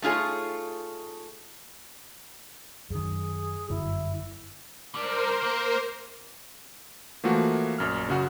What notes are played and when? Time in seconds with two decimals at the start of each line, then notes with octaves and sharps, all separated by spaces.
0.02 A3 D#4 F4 G#4 C#5
2.90 F#2 D#3 G#4
3.70 G1 F#2 F#3 E4
4.95 G3 D4 A#4 C5
5.43 A#3
7.24 E3 F3 A3 A#3 F#4
7.78 A#1 F#2 F6
8.08 F#2 C#3 F#4